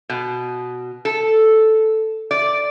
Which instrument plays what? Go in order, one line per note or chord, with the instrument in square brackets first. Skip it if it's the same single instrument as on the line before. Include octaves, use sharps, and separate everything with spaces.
[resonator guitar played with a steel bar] B2
A4
D5